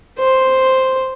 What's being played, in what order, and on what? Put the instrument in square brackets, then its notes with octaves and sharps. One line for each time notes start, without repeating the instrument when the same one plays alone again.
[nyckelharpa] C5